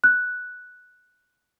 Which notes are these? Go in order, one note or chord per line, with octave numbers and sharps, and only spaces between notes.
F#6